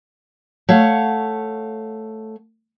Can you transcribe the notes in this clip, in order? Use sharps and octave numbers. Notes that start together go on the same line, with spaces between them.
A3 C#5 F5 F#5